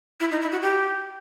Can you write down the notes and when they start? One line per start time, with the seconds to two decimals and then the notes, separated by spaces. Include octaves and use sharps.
0.20 E4
0.31 D#4
0.41 E4
0.52 F#4
0.62 G4